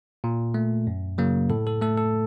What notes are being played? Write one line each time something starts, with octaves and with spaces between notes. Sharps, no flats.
A#2
A3
F#2
C#3 F#3 A#3
A2 A4
A4
A3 A4
A4